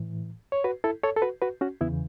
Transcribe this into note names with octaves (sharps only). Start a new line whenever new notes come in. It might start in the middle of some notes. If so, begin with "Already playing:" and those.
Already playing: A2 E3
C#5
F#4 B4
E4 A4
A4 C#5
A4
F#4 B4
F#4 B4
C#4 F#4
E2 C#3 E3 B3 E4